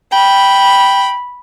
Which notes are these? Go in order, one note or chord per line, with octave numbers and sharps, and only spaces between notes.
G5 B5